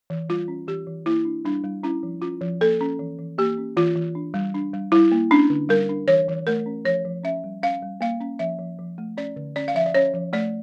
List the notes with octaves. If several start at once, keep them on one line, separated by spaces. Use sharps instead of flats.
E3
G3 F4
C#4
E3 G4
E3
A#3 E4
D4
G3 D4
G3
C#4 E4
F3
C#4 F4
F3
A#3 A4
C#4
E3
E3
A#3 G4
C#4
E3 F4
E3
D4
G3
D4
G3
G3 E4
A#3
C#4 D4
D3
G3 A#4
D4
E3 C#5
E3
A3 A#4
C#4
F3 C#5
F3
C#4 E5
G3
C#4 F5
G3
A#3 F5
C#4
F3 E5
F3
F3
A3
C#4 D5
D3
C#4 D5
F5
F3 E5
D5
C#4 C#5
F3
A3 D5